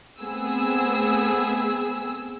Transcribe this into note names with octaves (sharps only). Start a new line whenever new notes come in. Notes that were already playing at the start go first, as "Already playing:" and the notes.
A3 B3 C4 G#4 E6